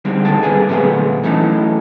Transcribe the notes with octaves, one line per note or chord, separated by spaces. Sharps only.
D3 D#3 G3 G#3 C4
D#2 A#2 G#3 A4 G5 A5
G2 C3 G3 G#4 B4 G#5
A#2 D3 F#3 A3 B3 C4
E3 F#3 A3 C#4 D#4 A4